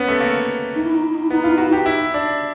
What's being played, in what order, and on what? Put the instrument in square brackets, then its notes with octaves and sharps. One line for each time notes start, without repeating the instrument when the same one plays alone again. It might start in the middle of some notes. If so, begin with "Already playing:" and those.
Already playing: [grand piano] B3 C#4
A3
A#3
[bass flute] D#4
E4
D#4
E4
D#4
E4
[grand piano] B3 [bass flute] D#4
[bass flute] E4 [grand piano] F4
[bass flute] D#4
[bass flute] E4 [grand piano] F#4
[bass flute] D#4 [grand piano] G4
[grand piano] E4
D4